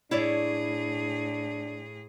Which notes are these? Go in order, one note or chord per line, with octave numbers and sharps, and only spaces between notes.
A2 D4 E4 G#4 C#5 D5